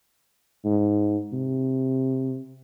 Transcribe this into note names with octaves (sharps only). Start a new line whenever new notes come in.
G#2
C3